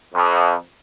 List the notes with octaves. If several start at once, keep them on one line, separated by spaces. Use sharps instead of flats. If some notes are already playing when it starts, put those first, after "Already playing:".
F2